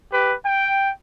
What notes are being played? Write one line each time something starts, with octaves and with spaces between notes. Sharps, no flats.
G4 B4
G5